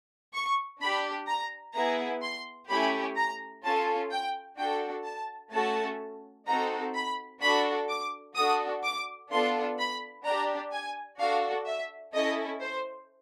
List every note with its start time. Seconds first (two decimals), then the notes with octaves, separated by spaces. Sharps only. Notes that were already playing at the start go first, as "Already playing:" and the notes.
0.34 C#6
0.80 D4 G4 B5
1.28 A#5
1.75 B3 E4 G#4 A#5
2.23 C6
2.69 A3 C#4 E4 G4 B5
3.17 A#5
3.64 C#4 F4 A4 A5
4.11 G5
4.58 D4 F#4 A4 G5
5.05 A5
5.53 A3 C#4 F#4 A4 A5
6.47 C4 D#4 F#4 A4 A#5
6.95 B5
7.41 D4 F#4 A4 B5
7.89 D6
8.36 D4 F#4 A4 D#6
8.83 D6
9.30 B3 D4 F4 A4 C6
9.78 B5
10.25 D4 G4 A#5
10.72 G#5
11.19 D4 F#4 A4 F5
11.66 E5
12.14 C#4 E4 A4 D#5
12.61 C5